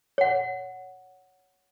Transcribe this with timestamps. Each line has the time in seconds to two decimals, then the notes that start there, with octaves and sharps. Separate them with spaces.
0.18 C#5 F#5